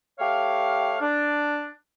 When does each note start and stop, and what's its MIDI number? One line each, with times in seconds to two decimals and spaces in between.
0.19 0.96 57
0.19 0.96 67
0.19 0.96 73
0.19 0.96 77
1.01 1.67 62